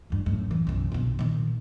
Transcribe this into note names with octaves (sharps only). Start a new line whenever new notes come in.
G1 G2
F#2 A2
E3
F#1 B1
A#1 B2
A#2 D#3